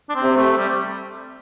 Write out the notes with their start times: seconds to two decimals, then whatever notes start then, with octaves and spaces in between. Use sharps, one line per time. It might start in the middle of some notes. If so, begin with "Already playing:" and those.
0.09 D4
0.15 C4
0.23 C3
0.36 A3
0.58 G3